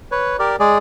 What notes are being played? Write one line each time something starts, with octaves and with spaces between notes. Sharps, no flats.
B4 C#5
G4 A#4 D5
G#3 G#4 D5